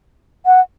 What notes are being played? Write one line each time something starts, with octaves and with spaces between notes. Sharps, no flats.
F#5